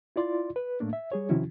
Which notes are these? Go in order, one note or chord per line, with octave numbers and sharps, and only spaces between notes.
E4 F4 D5 C6
B4
A2 A3 A#3 D4
E5
G3 G#4 C#5
C3 D#3 F3 C#4 E4 F#4